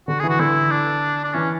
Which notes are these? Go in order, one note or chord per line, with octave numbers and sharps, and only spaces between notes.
D3 F#4
E3 G#4
F#4
D3 E4
D4
D4
E3 C#4